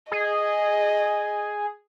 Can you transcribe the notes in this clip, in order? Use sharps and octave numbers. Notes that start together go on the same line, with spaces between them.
G#4 D#5